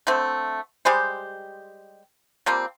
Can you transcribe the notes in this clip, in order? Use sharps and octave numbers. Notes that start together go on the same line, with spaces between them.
D3 A3 C4
G3 G#3 G4 C5
F3 G3 A#3 C4